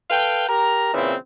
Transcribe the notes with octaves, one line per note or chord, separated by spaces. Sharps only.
A4 B4 F5 G5
G4 A#4 A#5
A#2 C#3 E3 C4 E4